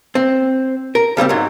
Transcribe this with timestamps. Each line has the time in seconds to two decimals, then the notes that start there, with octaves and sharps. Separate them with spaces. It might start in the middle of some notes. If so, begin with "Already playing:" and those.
0.15 C4
0.95 A#4
1.17 C#3 G3 A#3 C4
1.29 G#2 F#3